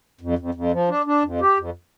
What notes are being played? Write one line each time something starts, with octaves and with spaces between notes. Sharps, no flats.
F2
F2
F2
F3
D4
D4
F2
G4
F2